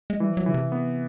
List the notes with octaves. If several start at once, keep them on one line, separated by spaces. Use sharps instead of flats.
G#3
E3 G3
F3
F#3
C#3 E3
C3
B3